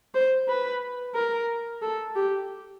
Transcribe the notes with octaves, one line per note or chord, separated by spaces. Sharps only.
C5
B4
A#4
A4
G4